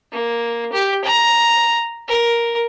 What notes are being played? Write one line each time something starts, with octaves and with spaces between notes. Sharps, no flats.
A#3
G4
A#5
A#4